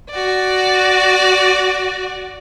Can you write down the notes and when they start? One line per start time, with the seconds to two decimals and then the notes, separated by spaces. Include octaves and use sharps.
0.10 F#4 D5